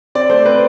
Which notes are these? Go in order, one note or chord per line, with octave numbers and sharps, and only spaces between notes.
C4 D5
A3 C5
C4 B4